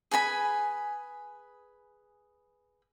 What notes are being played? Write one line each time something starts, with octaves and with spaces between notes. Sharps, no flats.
G#4 B4 G#5 B5